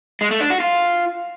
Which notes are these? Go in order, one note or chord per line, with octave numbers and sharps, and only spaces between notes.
G#3
A3
D4
F#4
F4